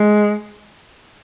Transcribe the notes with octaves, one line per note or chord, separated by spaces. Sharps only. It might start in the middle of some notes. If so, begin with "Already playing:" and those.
Already playing: G#3